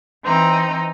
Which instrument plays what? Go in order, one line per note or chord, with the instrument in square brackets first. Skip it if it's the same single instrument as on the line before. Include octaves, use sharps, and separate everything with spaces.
[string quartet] E3 C4 D#4 A#5